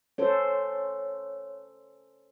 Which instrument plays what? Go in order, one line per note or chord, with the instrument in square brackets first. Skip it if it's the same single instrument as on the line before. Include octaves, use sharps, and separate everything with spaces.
[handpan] C#4 A4 C5 [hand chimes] C#5